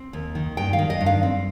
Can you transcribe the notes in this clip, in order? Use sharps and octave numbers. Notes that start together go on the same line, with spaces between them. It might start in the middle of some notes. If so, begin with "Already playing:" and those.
Already playing: C4
D#2
D#3
G2 G5
F5
D#3
D#5
G2
F5
C4